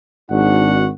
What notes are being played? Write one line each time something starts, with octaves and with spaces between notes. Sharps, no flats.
G#1 G#2 D4 F#4 F#5